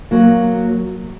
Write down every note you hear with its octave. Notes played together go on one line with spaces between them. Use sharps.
F#3 A#3